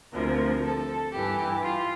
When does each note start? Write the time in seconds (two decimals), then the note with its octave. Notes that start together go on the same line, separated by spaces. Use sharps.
0.13 D2 C3 F3 A#4
0.63 A4
1.13 G2 E3 G4
1.62 F4